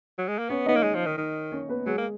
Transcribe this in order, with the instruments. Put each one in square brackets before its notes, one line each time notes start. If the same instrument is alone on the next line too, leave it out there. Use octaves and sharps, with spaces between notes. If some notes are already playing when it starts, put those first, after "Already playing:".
[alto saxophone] F#3
G#3
A#3
[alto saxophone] B3 [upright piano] C#4 C#5
[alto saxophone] B3 [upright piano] D#4 D#5
[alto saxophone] A#3
G#3
F3
D#3
D#3
[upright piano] C#4 C#5
B3 B4
[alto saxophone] F#3 [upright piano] G#3 G#4
[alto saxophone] A#3